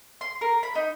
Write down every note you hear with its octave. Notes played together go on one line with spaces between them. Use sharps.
C6
A#4
B5
D#4